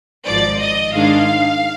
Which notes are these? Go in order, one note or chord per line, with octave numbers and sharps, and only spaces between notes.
G#1 G#2 F3 D5
D#5
G#2 D#3 G#3 D4 F5